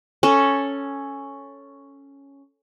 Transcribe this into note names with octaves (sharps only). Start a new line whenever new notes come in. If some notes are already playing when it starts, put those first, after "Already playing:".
C#4 A4